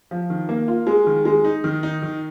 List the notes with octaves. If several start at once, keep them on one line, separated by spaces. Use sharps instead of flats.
F3
D#3
A#3
F4
G#3
D#3
G#3
D#4
D#3
D#4
D#3